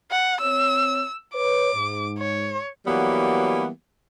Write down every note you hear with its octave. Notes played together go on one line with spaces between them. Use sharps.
F#5
C4 C#5 E6
B4 C#5 D6
G#2
C#5
E3 F#3 G3 A#3 B3